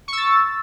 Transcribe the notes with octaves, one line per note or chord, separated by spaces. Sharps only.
C#6 E6 A6